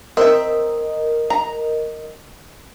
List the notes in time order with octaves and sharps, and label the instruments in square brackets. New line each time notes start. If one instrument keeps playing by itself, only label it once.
[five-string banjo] C4 E5 [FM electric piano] A#4 D#5
[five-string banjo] A#5